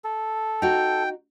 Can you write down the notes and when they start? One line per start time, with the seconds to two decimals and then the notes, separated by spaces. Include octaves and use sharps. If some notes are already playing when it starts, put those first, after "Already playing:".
0.04 A4
0.62 D#4 F#4 G5